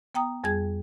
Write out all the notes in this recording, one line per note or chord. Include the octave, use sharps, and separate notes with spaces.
B3 G5 A#5 D#6
F2 G3 G#4 G#6